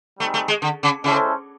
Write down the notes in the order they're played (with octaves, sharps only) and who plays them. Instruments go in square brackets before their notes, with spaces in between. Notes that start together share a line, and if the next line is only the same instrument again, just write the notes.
[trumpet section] G3 C4 D#4 G#4 [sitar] A3
[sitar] A3
G#3
D3
C#3
[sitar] C#3 [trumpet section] G#3 C#4 E4 A4 C5